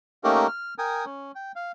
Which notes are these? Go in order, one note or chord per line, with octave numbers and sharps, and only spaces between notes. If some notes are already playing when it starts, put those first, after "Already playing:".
A3 A#3 C#4 D#4 G4 A#4
F6
A#4 G5 G#5 D#6
C#4
G5
F5